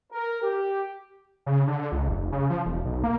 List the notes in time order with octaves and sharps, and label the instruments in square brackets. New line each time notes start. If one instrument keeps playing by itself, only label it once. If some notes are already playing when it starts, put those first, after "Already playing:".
[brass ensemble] A#4
G4
[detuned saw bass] C#3
D3
C#2
F1
C#3
F3
E1
B1
A#3